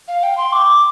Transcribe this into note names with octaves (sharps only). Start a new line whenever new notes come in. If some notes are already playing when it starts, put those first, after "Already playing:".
F5
G5
C6
D6